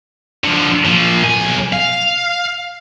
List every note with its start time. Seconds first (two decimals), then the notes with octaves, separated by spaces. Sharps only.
0.44 D3 F3
0.85 A#2 F3
1.24 B1 G#5
1.73 F5